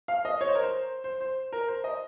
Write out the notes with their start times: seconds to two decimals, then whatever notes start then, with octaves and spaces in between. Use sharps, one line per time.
0.08 F5
0.25 D#5
0.41 C#5
0.48 C5
0.55 A#4
0.63 C5
1.04 C5
1.21 C5
1.53 A#4
1.68 C5
1.84 D#5